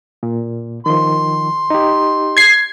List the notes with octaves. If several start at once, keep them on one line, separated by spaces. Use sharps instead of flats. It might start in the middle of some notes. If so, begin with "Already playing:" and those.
A#2
D#3 F3 C6
D#4 G4
G#6 C7